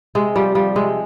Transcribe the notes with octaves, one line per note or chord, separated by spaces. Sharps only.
C3 G#3
F3 G3
F3 G3
C3 G#3